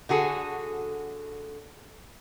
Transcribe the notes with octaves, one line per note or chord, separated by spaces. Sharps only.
D3 F#4 G#4 A4